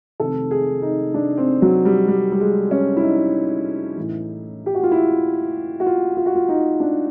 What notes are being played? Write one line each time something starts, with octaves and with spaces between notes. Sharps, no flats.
F1 F2 C3 D#3 A4
G#4
D#4
D4
C4
F#3
G3
G3
G3
G#3
C#4
E4
D#4
A1 A2 E3
G4
F#4
F4
E4
F#4
F4
F4
F#4
F4
D#4
D4